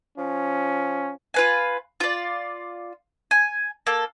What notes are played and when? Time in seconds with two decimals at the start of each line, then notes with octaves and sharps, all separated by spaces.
0.18 F3 C#4
1.34 F4 B4 G#5
2.00 F4 D5
3.31 G#5
3.87 A#3 A4